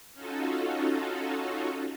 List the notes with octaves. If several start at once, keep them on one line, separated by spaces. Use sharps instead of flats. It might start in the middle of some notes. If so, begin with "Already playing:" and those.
C#4 D#4 F4 F#4 A4